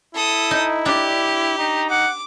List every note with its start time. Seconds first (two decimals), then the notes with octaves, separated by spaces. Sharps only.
0.15 E4 A4 D#6
0.51 D#4
0.86 D4 G4
1.59 D#4 A#5
1.90 F#5 D6